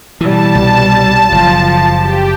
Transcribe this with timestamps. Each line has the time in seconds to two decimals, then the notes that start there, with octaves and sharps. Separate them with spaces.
0.21 B2 E3 G3 A5
0.55 C2
1.32 F#1 F3
1.98 G4